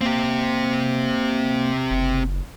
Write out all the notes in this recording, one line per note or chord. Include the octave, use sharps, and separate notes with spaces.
A#3 C4 G4
F#1